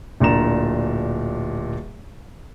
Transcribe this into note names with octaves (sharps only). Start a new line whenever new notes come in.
D1 A#2 D4 A#5 E7